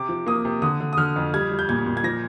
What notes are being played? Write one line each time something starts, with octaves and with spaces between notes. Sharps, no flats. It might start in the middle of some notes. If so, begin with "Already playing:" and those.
Already playing: C3 D6
F3
A#3 D#6
C3
D3 D#6
D3
D#6
D3 F6
F2
G3 G#6
G3
G6
A#2 G#6
A#2
G#6
F3 A#6